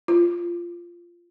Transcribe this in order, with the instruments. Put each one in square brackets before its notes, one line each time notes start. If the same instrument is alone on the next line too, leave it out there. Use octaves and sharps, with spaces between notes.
[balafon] F4